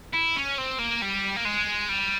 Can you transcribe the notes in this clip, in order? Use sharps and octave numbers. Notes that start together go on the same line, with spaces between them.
E4
C#4
C4
A#3
G3
A#3
G#3
G3